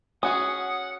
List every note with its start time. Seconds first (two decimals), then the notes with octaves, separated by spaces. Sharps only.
0.23 C#4 F#4 G#4 F#5 D#6